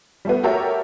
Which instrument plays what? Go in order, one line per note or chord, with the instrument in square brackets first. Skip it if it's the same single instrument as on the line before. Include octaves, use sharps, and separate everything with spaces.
[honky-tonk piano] G3 A3 B3
F#4 G4 A4 A#4 C#5 E5